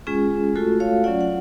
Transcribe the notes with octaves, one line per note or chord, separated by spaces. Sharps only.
G#3 C#4 F4 G#4
A3 F4 F#4 A4
C#5 F5
F#3 C#4 F4 D5 F#5
F#5